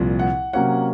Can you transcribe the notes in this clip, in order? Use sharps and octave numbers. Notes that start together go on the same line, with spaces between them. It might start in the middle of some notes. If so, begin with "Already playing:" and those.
Already playing: C2 A#2 F3 C4
F#5
C3 F#3 A#3 C#4 F#5